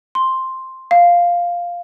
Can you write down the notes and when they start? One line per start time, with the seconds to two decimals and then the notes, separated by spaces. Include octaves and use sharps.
0.15 C6
0.91 F5